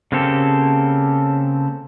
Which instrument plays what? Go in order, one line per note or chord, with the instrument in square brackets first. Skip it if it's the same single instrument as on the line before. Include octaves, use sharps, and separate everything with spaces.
[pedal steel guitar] C#3 A#3 C4 G4 A4